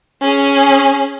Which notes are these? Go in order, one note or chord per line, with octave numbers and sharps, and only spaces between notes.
C#4 G#4